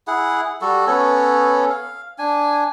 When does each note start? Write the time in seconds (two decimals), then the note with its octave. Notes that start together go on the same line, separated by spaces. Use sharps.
0.07 E4 G#4 F#5
0.62 G3 F#4 A4
0.87 B3 C#4 A4 C#5
1.70 F5
2.18 D4 G#5